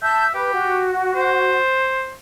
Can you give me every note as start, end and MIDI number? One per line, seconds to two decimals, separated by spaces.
0.02 0.31 76
0.02 0.25 81
0.02 0.25 91
0.34 0.85 67
0.34 0.51 71
0.53 1.59 66
1.16 2.12 72